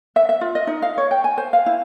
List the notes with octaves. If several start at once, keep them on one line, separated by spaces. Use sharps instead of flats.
E5
E5
F4
D#5
D#4
F5
C#5
G5
G#5
C5
F5
E4